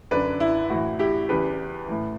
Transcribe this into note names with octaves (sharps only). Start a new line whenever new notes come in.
F#2 D3 B4 D5
E4
A2 E3 F#4
E4 G4
E2 C#3 E3 G4 B4
A2 E3